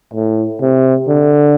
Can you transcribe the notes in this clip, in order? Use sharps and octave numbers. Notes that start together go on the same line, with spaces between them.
A2
C3
D3